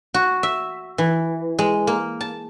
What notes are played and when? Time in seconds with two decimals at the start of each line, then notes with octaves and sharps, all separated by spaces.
0.14 F#4
0.43 E5
0.98 E3
1.59 G#3
1.87 A#3
2.21 A5